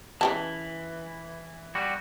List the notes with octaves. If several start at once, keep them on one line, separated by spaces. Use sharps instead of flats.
C#3 E3 G4 A5
G3 F#4